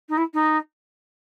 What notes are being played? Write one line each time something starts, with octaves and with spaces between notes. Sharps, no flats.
D#4
E4
D#4